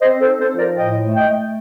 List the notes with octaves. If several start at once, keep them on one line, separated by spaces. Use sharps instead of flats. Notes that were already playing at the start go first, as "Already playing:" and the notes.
C4 C5 D#5
A4 C5
D#4
A4 C5
F3
A#4 D5
A2 D#5 G5
A3
D#5 G5
A3